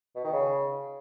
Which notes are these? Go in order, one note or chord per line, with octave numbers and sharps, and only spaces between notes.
B2
D#3
C#3